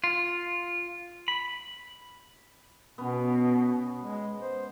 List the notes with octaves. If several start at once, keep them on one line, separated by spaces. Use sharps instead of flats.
F4
B5
B2 B3 C#4
G#3
C5